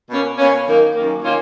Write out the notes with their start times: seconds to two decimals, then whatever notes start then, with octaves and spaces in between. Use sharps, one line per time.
0.09 B2 A#3 C#4
0.38 B2 A#3 C#4
0.67 F#2 D#3 A#3
0.95 F#2 D#3 A#3
1.24 D#3 A#3 C#4 F4